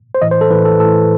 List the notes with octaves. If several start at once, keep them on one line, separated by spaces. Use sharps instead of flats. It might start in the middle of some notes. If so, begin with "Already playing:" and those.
C5
A2 E3 D#5
C5
A4
A2 E3 B4
A4
A2 E3 A4